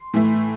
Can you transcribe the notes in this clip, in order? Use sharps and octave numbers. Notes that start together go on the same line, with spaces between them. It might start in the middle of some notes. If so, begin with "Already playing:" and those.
Already playing: C6
A2 E3 A3